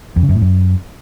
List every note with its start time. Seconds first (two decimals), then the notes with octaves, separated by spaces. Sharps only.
0.16 F2
0.23 C#3
0.29 F#2
0.35 A2
0.41 F#2